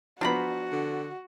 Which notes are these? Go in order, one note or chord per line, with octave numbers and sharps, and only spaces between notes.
F3 B3 D4 F#4 A#5 B5
D3